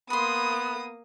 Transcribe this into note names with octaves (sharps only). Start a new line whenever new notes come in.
A#3 B3 B5 C6 D#6